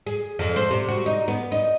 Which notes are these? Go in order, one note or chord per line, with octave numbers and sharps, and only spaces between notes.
G#4
F2
C5
C3
F#4
D#4
B3
D#4